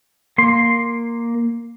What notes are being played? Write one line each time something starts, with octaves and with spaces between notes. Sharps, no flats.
A#3 C6